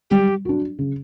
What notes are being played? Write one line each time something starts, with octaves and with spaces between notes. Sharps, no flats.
G3 G4
D4 F#4
C#3